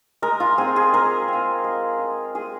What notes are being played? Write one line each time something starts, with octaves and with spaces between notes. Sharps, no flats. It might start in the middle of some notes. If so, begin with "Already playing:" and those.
G#3 A#4
F4
C4 F4 G#4
G#4
G#3 A#4
C4 F4
G#3
F4
G#3 G#4